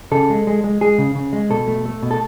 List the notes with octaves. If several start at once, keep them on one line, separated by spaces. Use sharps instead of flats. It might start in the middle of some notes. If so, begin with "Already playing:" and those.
C#3 A4
G#3
G#3
G#3
G#3 G#4
C#3
C#3
G#3
B2 A4
A3
A3
B2
A4